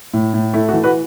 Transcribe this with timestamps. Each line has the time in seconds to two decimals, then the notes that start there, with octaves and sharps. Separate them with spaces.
0.14 A2
0.34 A2
0.54 A3 E4
0.69 F#4
0.73 E3
0.84 F#4 B4